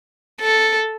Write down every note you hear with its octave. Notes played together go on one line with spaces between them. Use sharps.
A4